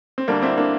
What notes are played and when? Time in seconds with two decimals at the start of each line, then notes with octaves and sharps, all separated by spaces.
0.18 C4
0.28 D2 D3 G3 A#3 D4
0.42 C4 E4
0.57 A#3 D4